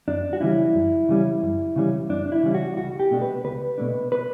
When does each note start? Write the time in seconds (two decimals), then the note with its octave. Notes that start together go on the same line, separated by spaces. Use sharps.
0.08 F#2 D4
0.33 F#4
0.41 C#3 E3 G3 C#4 E4
0.75 F#2
1.09 C#3 E3 G3 C#4
1.43 F#2
1.76 C#3 E3 G3 C#4
2.10 F#2 D4
2.26 D4
2.32 E4
2.43 C#3 E3 G3 C#4
2.54 F#4
2.77 C#2 F#4
3.00 G4
3.11 B2 A3 D4
3.22 B4
3.44 C#2 B4
3.78 B2 A3 D4
4.12 B4